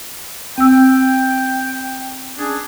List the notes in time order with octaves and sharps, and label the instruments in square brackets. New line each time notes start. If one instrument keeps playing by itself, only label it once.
[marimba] C4 E6 [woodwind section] G5
[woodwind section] C#4 D4 G#4